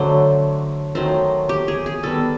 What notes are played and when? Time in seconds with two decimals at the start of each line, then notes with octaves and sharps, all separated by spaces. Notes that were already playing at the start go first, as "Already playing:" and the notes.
Already playing: D3 F#3 A3 C5
0.95 D#3 F#3 A3 C5
1.49 G4
1.68 G#4
1.86 G#4
2.03 D#3 G3 B3 A4